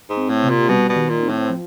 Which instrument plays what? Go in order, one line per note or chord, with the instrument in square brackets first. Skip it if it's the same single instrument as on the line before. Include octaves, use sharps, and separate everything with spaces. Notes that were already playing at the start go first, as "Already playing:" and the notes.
[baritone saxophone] G#2
[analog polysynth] C4
[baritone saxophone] A2
[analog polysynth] C3
[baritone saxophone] A#2
[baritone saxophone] B2 [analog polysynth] G3
[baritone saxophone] B2
[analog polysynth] D#3
[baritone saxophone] A#2
[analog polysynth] C4
[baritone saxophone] A2
[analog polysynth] F3